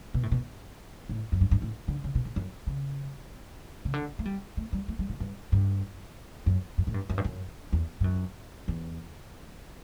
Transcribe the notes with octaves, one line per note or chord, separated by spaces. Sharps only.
B2
A2
B2
A2
F#2
G2
G2
A2
D3
C#3
B2
A2
F#2
C#3
C#3
D3
A3
G3
A3
G3
A3
G3
A2
G2
G2
F#2
F#2
A2
G2
F#2
G2
F#2
E2
G2
F#2
E2